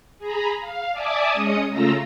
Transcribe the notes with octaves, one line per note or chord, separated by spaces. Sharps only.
G#4 A#5 B5
F5
D5 E5 G#5 A5 D6 D#6
G#3 C#4 D#5 D#6 C#7
C#3 A3 F4 A#5 E6 A#6